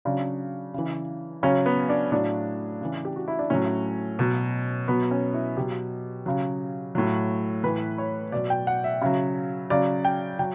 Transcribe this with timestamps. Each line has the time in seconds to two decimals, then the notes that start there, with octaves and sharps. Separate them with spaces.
0.05 C#3 F#3 D4
0.74 C#3 E3
1.43 C#3 F#3 C#4
1.66 B3
1.89 D4
2.12 A2 F#3 D4
2.81 C#3 E3
3.05 G4
3.16 F#4
3.28 E4
3.39 D4
3.50 A2 F#3 C#4
4.19 B2 F#3
4.88 B2 F#3 B3
5.11 C#4
5.34 E4
5.57 B2 F#3 G4
6.26 C#3 F#3
6.95 A2 F#3
7.64 A2 E3 B4
7.98 C#5
8.32 B2 F#3 D5
8.50 G5
8.67 F#5
8.84 E5
9.02 C#3 F#3
9.70 C#3 F#3 D5
10.05 G5
10.39 F#3 G5